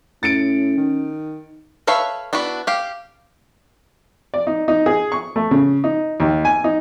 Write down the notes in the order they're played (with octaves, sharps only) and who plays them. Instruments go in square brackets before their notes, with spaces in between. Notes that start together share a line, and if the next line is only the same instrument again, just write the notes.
[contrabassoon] A2 [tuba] C#4 [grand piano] A6 C#7 D7
[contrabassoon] D#3
[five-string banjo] A4 B4 C#5 E5 F5
B3 D4 E4 F#4
G4 F5
[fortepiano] D5
D#4
D#4
G#4
C#6
A3
C#3
D#4
D#2
G#5
D#4